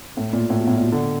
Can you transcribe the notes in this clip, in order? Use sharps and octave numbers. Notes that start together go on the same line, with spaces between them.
A2
A#2
A2
B2
A2
A#2
B2
D3